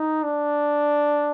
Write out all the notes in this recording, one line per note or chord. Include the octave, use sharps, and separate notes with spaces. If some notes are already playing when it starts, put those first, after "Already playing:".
Already playing: D#4
D4